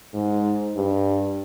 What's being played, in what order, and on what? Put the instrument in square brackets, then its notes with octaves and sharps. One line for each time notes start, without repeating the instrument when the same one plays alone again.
[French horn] G#2
G2